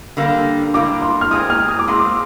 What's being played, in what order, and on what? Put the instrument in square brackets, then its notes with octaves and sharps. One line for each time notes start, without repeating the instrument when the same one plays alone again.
[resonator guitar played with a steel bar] D3 G3 A#3
[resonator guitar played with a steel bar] D3 G3 A#3 [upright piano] D6
[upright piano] C6
F6
[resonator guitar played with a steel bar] A#2 G#3 C4 [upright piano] D#6
[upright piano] F6
D#6
D6
[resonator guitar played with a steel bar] A#2 G#3 C4 [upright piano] C6
[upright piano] D6